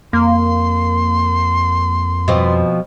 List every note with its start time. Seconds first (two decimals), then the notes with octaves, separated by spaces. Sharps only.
0.13 F2 A#3 C6
2.28 B2 F3 C4